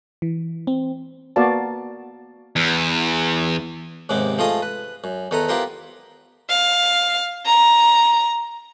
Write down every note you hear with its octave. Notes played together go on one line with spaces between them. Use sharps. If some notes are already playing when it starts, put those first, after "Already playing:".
E3
C4
A#3 B3 F#4 D5 F5 A5
E2
D#2 G#2 C3 B3 C4 D6
F3 A3 F4 G#4 D#5 D#6
B4
F#2
E2 D#3 A4 B4 A#5
B3 E4 F4 G4 A#4 C5
F5
A#5